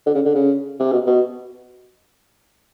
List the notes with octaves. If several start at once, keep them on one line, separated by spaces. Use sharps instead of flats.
D3
C#3
D3
C#3
C3
B2
B2